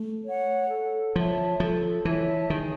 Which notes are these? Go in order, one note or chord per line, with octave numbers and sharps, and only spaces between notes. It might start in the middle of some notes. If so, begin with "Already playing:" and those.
Already playing: A3
C#5 F#5
A4
F3 C#5 E5 A5
F3 A4
E3 C#5 E5 A5
D#3 G#4